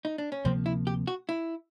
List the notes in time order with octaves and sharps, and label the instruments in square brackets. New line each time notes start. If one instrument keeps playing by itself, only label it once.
[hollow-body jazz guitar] D#4
D4
C#4
[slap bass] D2 C3 F3 A#3 [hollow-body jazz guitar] C4
[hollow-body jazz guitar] E4
G4
F#4
E4